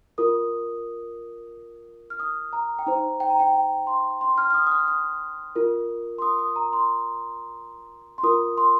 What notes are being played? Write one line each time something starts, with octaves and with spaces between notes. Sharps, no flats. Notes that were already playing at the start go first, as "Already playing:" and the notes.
F4 A#4 D#6
F6
D#6
A#5
G5
D#4 C5 A#5
G5
A#5
G5
G5
C6
C6
F6
F6
D#6
D#6
F6
D#6
F4 A#4
C6
D#6
D#6
A#5
C6
C6
F4 A#4 D#6
C6